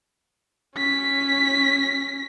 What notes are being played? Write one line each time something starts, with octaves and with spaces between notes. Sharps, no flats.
C#4 B6